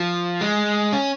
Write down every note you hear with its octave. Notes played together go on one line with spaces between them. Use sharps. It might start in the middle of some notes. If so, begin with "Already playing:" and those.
Already playing: F3
G#3
C#4